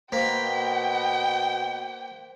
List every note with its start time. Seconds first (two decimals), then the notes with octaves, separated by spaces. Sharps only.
0.12 B2 A#3 C5 G5 B6